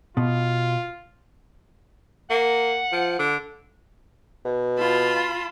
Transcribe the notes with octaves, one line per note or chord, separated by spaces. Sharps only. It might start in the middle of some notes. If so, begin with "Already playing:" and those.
B2 F4
A#3 F#5
F3
D3
B2
F4 A5 B5